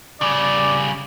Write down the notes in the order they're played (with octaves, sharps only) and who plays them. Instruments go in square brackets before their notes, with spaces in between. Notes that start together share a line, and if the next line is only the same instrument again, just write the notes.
[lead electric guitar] C#3 G3 [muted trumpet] D5